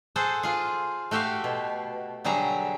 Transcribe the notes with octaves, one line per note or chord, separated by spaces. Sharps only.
G#4 A4 C5 F#5
F4 G#4
A3 F#4 G4 E5 F5
B2
D3 F#3 G3 G#4 E5 A#5